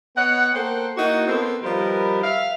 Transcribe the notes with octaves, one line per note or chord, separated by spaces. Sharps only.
B3 C#5 D#5 F#5
A#3 A4 A#4 C5 F#5 G5
A#3 D#4 E4 F#4
B3 C4 A4 A#4 C5
D#3 F3 G3 G4 A#4 B4
E5 F5